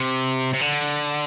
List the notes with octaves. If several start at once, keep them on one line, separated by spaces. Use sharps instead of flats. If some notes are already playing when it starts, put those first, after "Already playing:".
Already playing: C3
C3
D3